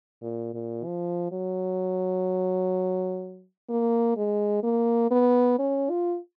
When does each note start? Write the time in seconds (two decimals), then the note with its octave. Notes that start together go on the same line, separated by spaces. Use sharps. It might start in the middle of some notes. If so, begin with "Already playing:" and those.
0.22 A#2
0.54 A#2
0.85 F3
1.32 F#3
3.70 A#3
4.16 G#3
4.63 A#3
5.11 B3
5.59 C#4
5.90 F4